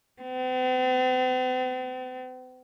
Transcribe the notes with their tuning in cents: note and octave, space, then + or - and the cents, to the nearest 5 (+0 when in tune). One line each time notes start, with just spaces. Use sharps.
C4 -45